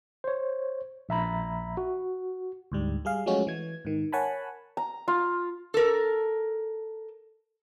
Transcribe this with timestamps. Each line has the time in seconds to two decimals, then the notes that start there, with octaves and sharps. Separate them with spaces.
0.24 C5 C#5
1.09 A#1 E5 A#5 B5
1.77 F#4
2.72 D2 G#2 G3
3.05 G3 G#4 F5
3.26 F3 F#3 G#3 A3 C#4 F#4
3.47 E3 G#6
3.85 G#2 D#3
4.12 A#4 C#5 F#5 G#5 A5 B5
4.77 A#5
5.08 F4
5.74 A4 A#4